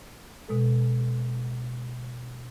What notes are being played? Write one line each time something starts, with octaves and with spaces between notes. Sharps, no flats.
B2 G#3 A4